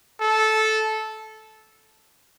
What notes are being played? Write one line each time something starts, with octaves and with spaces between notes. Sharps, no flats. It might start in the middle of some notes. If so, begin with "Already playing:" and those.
A4